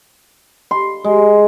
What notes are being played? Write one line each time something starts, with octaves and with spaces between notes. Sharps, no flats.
C6
G#3